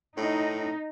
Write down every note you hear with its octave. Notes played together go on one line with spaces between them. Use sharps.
A2 D#4